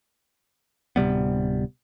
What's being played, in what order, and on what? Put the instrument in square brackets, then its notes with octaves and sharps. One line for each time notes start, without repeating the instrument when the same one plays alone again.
[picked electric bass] D1 C3 G3 B3